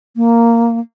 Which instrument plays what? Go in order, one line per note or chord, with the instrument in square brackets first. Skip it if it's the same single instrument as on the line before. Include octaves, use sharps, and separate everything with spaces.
[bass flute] A#3